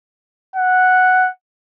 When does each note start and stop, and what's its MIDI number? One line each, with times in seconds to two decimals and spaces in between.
0.56 1.29 78